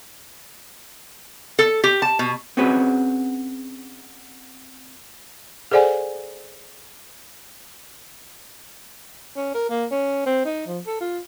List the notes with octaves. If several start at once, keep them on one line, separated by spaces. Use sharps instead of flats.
A4
G4
A5
B2
C4 C#4 F#4 G#4 B4
G#4 A4 C5 D5 F#5 G#5
C#4
A#4
A#3
C#4
C4
D#4
F3
A4
F4